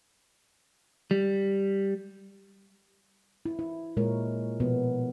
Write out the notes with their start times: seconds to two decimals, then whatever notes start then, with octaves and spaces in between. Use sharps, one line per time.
1.11 G3
3.46 E4
3.59 E4
3.97 A#2 G#3 A#4 C#5
4.60 B2 F3 B3